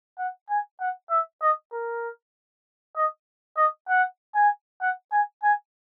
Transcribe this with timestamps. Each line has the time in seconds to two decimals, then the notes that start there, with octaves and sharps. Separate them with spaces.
0.19 F#5
0.50 G#5
0.81 F#5
1.11 E5
1.42 D#5
1.72 A#4
2.96 D#5
3.57 D#5
3.89 F#5
4.35 G#5
4.81 F#5
5.12 G#5
5.43 G#5